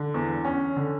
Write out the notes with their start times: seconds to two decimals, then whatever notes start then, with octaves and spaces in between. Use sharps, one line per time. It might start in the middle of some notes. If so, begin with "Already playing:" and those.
Already playing: D3
0.14 E2
0.44 C#4
0.76 D3